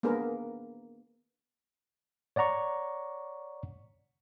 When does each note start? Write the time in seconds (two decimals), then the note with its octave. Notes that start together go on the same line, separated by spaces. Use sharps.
0.03 A#3 B3 D4 G#4 A#4 B4
2.36 C#5 D5 F#5 A#5 C#6